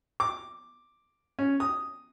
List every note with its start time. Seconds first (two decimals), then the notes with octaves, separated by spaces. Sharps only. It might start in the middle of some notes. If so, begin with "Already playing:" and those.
0.20 D6
1.39 C#4
1.60 D#6